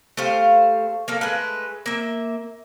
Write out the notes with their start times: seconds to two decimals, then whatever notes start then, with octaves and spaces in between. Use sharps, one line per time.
0.17 A3 G4 C5 F5
1.08 A#3 A4 F5
1.21 G#3 A3 B4
1.86 A#3 E5